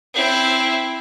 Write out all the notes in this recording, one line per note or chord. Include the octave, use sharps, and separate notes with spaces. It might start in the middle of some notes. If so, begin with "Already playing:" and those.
C4 E4